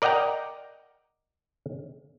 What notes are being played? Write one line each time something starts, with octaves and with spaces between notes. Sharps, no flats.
A#4 D5 D#5 F#5 G5 A#5